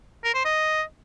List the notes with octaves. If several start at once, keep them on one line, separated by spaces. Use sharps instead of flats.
A#4
C5
D#5